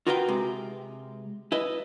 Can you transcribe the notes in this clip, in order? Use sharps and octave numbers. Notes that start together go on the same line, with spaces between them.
F4 F#4 A#4 B4 D5 G5
C3 G#3
E4 B4 D#5